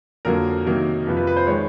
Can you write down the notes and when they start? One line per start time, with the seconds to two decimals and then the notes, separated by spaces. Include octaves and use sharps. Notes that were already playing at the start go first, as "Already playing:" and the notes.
0.25 F2 D3 F#3 A#3 A#4
0.66 C3 D#3 F#3 A#3
1.06 F2 C3 F3 B4
1.17 B4
1.27 B4
1.37 C5
1.47 D#3 G#3 C#5